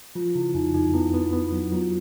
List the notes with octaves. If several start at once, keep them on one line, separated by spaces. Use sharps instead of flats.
F3 F4
C#3 E4
F2 D#4
F2 D#4
B3 E4
B3
B3
F#3
F#3 F4